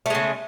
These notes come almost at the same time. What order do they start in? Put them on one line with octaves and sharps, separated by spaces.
A3 G#3 C#3